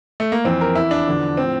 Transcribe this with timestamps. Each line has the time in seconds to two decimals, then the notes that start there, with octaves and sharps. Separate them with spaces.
0.20 A3
0.32 A#3
0.44 F2 E3 C4
0.61 A#4
0.75 E2 E3 E4
0.91 D4
1.07 E2 D3 F3
1.37 A2 F3 C4